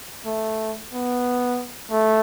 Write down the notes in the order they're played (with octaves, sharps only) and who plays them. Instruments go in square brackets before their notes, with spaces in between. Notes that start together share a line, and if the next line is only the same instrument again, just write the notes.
[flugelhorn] A3
B3
A3